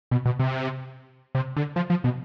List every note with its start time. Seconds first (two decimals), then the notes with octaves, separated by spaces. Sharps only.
0.11 B2
0.25 B2
0.39 C3
1.35 C3
1.56 D3
1.76 F3
1.90 F3
2.04 B2